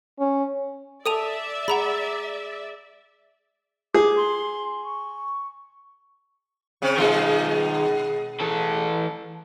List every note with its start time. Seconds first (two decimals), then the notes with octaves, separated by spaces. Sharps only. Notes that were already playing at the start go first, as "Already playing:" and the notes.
0.19 C#4
1.06 A4 D5 E5 A5 D#6 D#7 F7
1.68 G#4 F#5 A#5 B5
3.94 G#4 D6
4.16 C6
4.84 C#6
6.82 C#3 C4 C#4
6.98 B2 D#3 G#3 F4
8.40 E3 A4